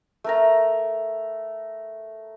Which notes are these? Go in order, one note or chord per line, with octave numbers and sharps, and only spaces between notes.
A3 A#4 A#5